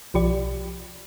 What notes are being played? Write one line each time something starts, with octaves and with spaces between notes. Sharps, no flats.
B1 F3 G4 D5